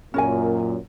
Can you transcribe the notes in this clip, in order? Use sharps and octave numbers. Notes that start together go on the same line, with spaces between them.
F#2 A#2 C#4 A#4 G#5